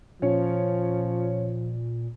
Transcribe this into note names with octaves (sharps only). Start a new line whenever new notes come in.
A#2 F3 C#4